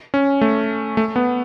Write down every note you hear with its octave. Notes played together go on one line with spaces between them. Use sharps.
C#4
A3
A3
B3